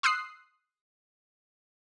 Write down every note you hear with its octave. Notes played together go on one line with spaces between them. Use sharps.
C6 D#6 E6 F#6 C7